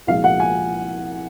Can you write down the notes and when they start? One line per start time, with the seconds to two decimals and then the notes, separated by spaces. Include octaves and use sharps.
0.07 C2 A#2 F3 G#3 F5
0.24 F#5
0.40 G#5